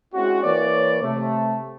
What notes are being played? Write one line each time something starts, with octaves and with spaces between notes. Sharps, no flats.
G#3 C4 C#4 E4 F#4
E3 A#3 C#5 D5
C3 A3